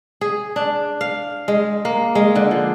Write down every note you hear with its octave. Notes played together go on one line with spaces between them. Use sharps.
G#4
D4
F5
G#3
A#3
G#3
D3
F3